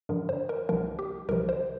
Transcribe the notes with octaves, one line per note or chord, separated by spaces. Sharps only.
G2 D3 F3 A#4
C5
A#4
C2 C3 F3 A#4
G4
C2 C3 F3 A#4
C5